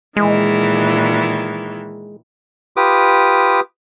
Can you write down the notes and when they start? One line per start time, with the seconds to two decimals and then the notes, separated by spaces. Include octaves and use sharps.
0.16 A#2 D#3 E3 G#3
2.77 F4 G4 B4 D6 D#6